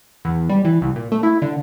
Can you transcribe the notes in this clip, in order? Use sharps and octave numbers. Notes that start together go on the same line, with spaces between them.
E2
G3
E3
C2
A#2
A3
E4
D3